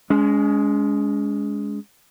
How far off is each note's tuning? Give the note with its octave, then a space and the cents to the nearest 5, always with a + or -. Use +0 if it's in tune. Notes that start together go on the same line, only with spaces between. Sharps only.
G#3 +0 C#4 +40